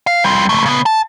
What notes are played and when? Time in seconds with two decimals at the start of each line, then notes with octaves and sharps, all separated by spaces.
0.07 F5
0.24 G3 F4
0.49 C#2 A3
0.66 C#3 B3
0.86 A5